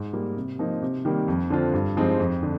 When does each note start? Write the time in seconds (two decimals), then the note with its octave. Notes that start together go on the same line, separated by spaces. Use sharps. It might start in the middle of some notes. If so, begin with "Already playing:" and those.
Already playing: G#2
0.13 G3 A#3
0.37 C3
0.59 F3 A#3 D#4
0.82 C3
1.05 D#3 G3 A#3
1.28 F2
1.50 D3 F3 C4 F4
1.74 G2
1.97 F3 G#3 C4 D#4
2.20 F2
2.43 D3